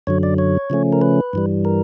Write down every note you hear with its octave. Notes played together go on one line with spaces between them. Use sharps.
F#2 D3 F#3 C#5
D5
C#5
C#3 F3 A3 C#4
A#4
B4
G2 E3 G3
A#4